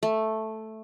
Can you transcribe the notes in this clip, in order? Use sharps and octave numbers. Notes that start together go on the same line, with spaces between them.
A3